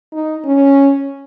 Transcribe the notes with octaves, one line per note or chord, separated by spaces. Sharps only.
D#4
C#4